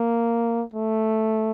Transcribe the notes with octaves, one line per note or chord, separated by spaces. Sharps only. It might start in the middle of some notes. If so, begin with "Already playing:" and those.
Already playing: A#3
A3